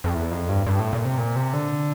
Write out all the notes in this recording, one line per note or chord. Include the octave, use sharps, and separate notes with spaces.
F2
E2
F2
G2
G2
A2
A#2
C3
A#2
C3
D3